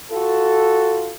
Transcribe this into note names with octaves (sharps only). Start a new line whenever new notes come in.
F4 F#4 A4